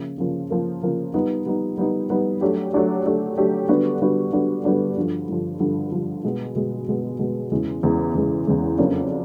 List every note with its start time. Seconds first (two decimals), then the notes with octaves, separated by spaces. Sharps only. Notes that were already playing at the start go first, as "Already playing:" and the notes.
Already playing: C#3 F3 A#3
0.18 C#3 F3 A#3
0.50 C#3 F3 A#3
0.83 C#3 F3 A#3
1.14 G3 B3 D#4
1.46 G3 B3 D#4
1.78 G3 B3 D#4
2.10 G3 B3 D#4
2.41 F#3 A3 D4 G4
2.73 F#3 A3 D4 G4
3.06 F#3 A3 D4 G4
3.37 F#3 A3 D4 G4
3.69 D3 G3 B3 D4 F#4
4.01 D3 G3 B3 D4 F#4
4.32 D3 G3 B3 D4 F#4
4.64 D3 G3 B3 D4 F#4
4.96 G2 D3 F3
5.29 G2 D3 F3
5.60 G2 D3 F3
5.91 G2 D3 F3
6.24 B2 G#3 B3
6.55 B2 G#3 B3
6.88 B2 G#3 B3
7.19 B2 G#3 B3
7.52 E2 C#3 E3 G#3
7.83 E2 C#3 E3 G#3
8.15 E2 C#3 E3 G#3
8.47 E2 C#3 E3 G#3
8.78 F2 C#3 F#3 A#3 D4